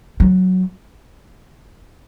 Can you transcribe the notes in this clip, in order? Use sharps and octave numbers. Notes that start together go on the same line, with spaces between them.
F#3